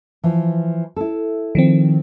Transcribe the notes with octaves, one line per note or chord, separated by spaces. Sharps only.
E3 F3
E4 A4
D#3 F3 C4